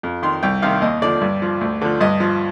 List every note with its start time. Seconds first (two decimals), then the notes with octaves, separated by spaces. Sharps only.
0.03 F2
0.23 D#3 C6
0.43 C2 G5
0.62 C3 D#3 F5
0.82 D#2 D#5
1.02 D3 F3 D5
1.21 G2
1.42 F3
1.61 D2
1.82 D3 F3
2.01 G2 D#5
2.20 F3